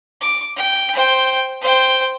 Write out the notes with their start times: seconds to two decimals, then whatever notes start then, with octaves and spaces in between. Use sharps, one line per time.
0.21 D6
0.56 G5
0.93 C5 G5
1.61 C5 G5